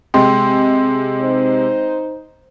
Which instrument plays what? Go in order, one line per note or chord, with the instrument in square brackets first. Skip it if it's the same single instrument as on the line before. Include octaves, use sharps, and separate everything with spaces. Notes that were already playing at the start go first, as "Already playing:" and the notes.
[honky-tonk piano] C3 G#3 [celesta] G5 C6
[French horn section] D#4 C5